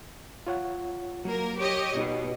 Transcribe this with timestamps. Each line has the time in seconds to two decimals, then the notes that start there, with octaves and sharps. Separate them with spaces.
0.47 F4 C#5 F#5
1.25 F#3 A#3 A#4
1.59 G4 C#5 D#5
1.97 B2 D#4 G4 B4